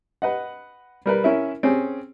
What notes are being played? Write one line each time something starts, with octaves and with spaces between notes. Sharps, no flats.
B4 D#5 F#5
G3 A#4 B4
C#4 E4 A#4 E5
C4 C#4 G#4